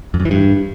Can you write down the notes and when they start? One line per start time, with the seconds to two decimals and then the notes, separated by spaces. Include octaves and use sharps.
0.14 F2
0.20 F#2
0.25 E3
0.31 G2